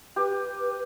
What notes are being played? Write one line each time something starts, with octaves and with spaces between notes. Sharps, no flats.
G4 B4